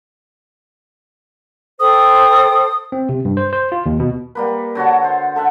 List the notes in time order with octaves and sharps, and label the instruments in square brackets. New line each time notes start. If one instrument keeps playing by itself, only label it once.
[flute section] A4 C5 G5 [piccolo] D#6
[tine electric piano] C4
C3
G2
C5
C5
F4
D#2
B2
[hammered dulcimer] G3 A#3 B4
D3 F#4 C#5 A5
C5
A4 E5 F#5